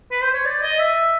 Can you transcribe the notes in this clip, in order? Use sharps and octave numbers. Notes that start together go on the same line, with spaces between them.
B4
C5
C#5
D5
D#5
E5